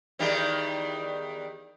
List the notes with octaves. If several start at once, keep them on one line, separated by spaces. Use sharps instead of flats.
E2 D#3 G3